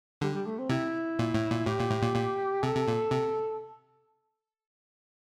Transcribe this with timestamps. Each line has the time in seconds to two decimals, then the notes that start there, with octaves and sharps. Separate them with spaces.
0.21 D3 G3
0.34 G3
0.47 A3
0.58 C4
0.69 C3 E4
1.19 A#2
1.34 A2
1.50 A#2
1.66 A2 G4
1.79 A#2
1.90 A2
2.02 A#2
2.15 A#2
2.63 C3 A4
2.75 C3
2.88 A#2
3.11 C3